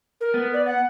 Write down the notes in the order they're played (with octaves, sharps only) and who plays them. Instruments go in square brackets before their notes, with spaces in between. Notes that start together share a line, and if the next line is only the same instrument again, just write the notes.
[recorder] A#4
[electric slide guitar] B3
[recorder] D5
F#5